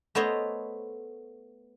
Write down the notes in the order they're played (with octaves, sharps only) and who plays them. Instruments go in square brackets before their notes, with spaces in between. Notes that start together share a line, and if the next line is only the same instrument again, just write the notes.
[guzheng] A3 B3 A4 C5 C#5 D#5